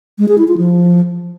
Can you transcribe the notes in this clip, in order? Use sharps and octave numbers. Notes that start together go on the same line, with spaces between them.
G#3
G#4
E4
F4
F3